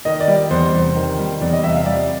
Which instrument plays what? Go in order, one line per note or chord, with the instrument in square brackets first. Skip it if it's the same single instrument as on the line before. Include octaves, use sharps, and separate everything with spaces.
[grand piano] D#3 D#5
D5
G3
E2 C5
C3
D#3
G3
E2 D5
D#5
C3 E5
F5
G3 D5